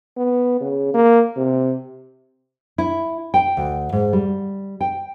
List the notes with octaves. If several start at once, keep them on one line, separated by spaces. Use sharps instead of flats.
B3
C#3
A#3
C3
E4
G5
D2
G#2
G3
G5